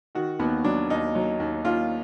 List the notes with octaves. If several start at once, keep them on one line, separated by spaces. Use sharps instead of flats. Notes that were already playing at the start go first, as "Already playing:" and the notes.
D#3 F#4
D#2 B3
F#3 D4
D#2 D#4
F#3
D#2
D#2 F4